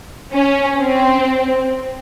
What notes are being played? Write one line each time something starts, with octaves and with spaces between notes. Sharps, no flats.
C#4
C4